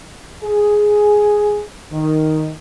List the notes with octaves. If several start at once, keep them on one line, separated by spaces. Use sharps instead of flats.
G#4
D#3